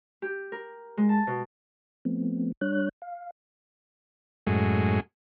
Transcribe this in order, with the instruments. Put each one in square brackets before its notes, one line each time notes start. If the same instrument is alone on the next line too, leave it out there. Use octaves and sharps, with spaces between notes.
[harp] G4
A#4
G#3
A5
B2
[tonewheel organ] F3 A3 B3 C4
G3 D4 C#5 F#6
F5
[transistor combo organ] F#2 A2 G#3